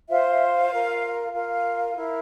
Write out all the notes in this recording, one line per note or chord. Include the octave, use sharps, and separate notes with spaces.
F4 C5 E5
E5
F5
F4 A#4
F4 A#4 F5
E4 A#4